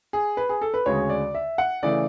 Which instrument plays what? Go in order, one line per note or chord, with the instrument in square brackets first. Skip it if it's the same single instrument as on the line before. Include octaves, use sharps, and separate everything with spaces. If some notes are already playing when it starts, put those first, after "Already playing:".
[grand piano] G#4
B4
G#4
A4
B4
D2 C#3 G#3 C#5
D5
E5
F#5
C#3 E3 A3 D5